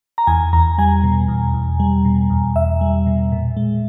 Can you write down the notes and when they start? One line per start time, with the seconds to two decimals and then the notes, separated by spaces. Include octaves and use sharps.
0.18 A#5
0.27 E2 G#5
0.53 E2 A#5
0.78 G3 G#5
1.04 B2
1.28 E2
1.54 E2
1.80 G3
2.05 B2
2.30 E2
2.56 E2 E5
2.81 G3
3.06 B2
3.32 A#2
3.57 G#3